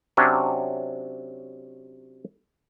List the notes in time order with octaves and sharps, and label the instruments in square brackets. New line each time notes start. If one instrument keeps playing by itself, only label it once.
[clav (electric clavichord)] C3 F#3 C#4 D4